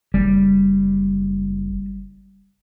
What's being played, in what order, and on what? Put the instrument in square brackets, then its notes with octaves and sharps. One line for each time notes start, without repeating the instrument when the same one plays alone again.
[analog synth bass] F#1 [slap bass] G3